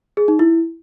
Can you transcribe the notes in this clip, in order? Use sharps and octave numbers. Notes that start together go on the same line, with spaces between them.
G#4
D#4
E4